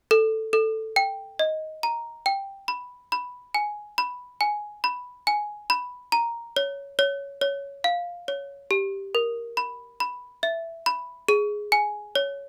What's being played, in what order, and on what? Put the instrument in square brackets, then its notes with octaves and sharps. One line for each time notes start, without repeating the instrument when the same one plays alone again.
[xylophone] A4
A4
G5
D#5
A#5
G5
B5
B5
G#5
B5
G#5
B5
G#5
B5
A#5
C#5
C#5
C#5
F5
C#5
G4
A#4
B5
B5
E5
B5
G#4
G#5
C#5